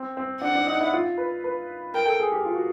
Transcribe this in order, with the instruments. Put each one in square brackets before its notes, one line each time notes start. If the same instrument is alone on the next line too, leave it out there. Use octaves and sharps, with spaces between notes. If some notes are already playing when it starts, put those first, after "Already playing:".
Already playing: [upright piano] C4
C4
[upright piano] D4 [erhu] F#5
[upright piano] D4
D#4
E4
F4
B4
B4
[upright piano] A#4 [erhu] G5
[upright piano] A4
G#4
G4
F4
F#4